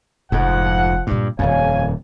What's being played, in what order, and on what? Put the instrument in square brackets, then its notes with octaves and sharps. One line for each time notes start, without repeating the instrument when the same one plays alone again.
[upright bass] F1 [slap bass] F2 G#2 [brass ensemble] F3 F#5
[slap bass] G2 [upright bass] A#2 G#3
[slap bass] D#1 F2 [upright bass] D#3 [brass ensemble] C#5 F5 G#5